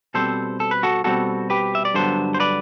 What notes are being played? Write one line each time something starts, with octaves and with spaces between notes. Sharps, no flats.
B2 G3 C4 A4 C5
A4
B4
F#4 A4
B2 G3 C4 F#4 A4
G4 B4
E5
D5
G2 D3 F#3 B3 A4 C5
C5
B4 D5